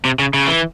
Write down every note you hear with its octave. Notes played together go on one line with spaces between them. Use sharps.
C3
C#3
C#3
E3